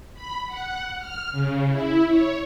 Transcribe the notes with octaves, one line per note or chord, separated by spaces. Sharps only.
B5
F#5
F6
C#3
E4
C#5